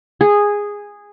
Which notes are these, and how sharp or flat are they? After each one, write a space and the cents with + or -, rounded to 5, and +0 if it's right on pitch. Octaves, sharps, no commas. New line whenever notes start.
G#4 -10